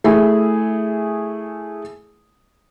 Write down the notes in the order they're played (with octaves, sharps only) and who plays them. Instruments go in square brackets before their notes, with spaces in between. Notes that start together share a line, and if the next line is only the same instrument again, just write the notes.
[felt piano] A3 E4 G#4